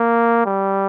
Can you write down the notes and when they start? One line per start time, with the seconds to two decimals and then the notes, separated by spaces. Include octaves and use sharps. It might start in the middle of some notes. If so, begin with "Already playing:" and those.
Already playing: A#3
0.46 G3